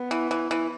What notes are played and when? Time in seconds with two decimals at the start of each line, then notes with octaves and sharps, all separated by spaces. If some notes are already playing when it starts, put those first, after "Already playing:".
Already playing: B3
0.11 E3
0.31 E3
0.51 E3